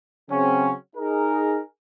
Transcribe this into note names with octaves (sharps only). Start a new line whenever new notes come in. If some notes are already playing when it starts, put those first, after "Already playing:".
C#3 F#3 C4 C#4
D#4 G#4 A#4